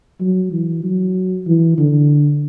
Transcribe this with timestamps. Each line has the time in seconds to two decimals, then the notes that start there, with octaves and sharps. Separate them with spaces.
0.20 F#3
0.52 E3
0.84 F#3
1.47 E3
1.78 D3